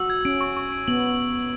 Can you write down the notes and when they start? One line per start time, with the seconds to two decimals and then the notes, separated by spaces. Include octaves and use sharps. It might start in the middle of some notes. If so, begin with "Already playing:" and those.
Already playing: F#4 E6
0.10 G#6
0.25 C#4 D7
0.41 C#6
0.56 C#6
0.72 D7
0.88 B3 F#7